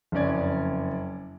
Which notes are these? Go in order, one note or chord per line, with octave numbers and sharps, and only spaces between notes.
F#1 F2 C#4 D5 G#6